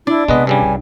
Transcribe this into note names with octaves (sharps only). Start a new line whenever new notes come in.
D4 E4 D5
C3 G#3 B3 B4 D#5
G2 C#3 G3 G#5
C2